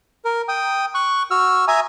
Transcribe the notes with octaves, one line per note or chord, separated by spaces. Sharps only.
A#4
G5 D#6
C#6 F#6
F#4 E6 F6
E5 G#5 A#5 D#6